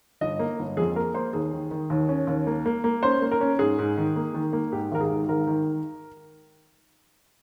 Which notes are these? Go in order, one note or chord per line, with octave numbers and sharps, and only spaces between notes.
G1 D#5
A#3
G1
F2 G#4
A#3 A#4
A#3 C5
D#2 G#4
D#3
D#3
D#2
C#4
D#2
A#3
A#3
A#3
C#4 C5
A#3
A#4
C#4
G#2 G#4
G#2
D#3
A#3
D#3
A#3
G#2 G4
G#1 A#4
G#4
G#2
G#1 A#4
D#3